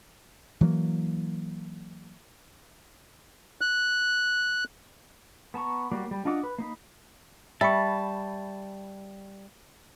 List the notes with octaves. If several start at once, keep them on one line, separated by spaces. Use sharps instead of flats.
E3 F#3 G#3 A#3
F#6
B3 A5 A#5 C#6
F#3 G3 A#3 F#4 D5
G3
D4 F4 D#5 F#5 D6
B4
A#3 D#4 B5
G3 E5 A5 B5 C#6